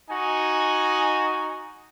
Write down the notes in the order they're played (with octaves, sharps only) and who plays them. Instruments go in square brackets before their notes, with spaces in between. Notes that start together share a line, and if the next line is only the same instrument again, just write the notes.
[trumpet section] D#4 F#4 G#5